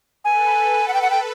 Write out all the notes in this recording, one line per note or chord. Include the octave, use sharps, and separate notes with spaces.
A4 B4 G#5
F#5
A4 B4 G5
F#5
G5